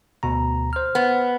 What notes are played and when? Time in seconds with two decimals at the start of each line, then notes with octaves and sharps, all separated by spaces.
0.23 D2 B2 A#5
0.73 C5 F6
0.95 B3